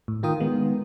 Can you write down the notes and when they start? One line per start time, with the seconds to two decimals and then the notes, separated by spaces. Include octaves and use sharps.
0.08 A2
0.23 D#3 F4 A#4 G5 D#6
0.40 D#3 G#3 B3